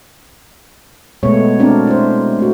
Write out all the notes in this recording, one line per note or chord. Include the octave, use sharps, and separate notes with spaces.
B2 G#3 A3 B3 C#5
A3 C4 D4 A#4 D5
E4 C5
A3 F#4